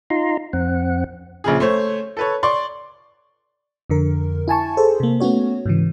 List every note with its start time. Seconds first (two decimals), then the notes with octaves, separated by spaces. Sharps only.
0.10 D#4 F4 A#5 C6
0.53 F2 C4 F#5
1.44 A#1 C#3 G#4
1.60 A3 C5 C#5
2.17 A4 B4 C#5
2.43 D5 C6 C#6
3.90 F2 D3 A#4
4.48 E4 G#5 A5 C#6
4.77 G#4 A4 C5
5.00 C3 A#3
5.20 A3 B3 C#4 F#4 C#5
5.66 G#2 C#3 E3